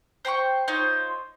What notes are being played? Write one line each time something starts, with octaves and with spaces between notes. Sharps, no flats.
C5 G5 B5 C#6
D#4 F4 C5 C#5